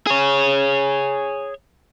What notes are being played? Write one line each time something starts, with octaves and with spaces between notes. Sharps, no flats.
G#4 C#5